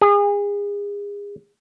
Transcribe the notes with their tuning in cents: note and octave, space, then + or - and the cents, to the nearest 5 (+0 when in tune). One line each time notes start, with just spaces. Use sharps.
G#4 -35